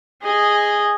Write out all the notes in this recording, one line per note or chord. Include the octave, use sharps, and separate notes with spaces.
G#4 D#5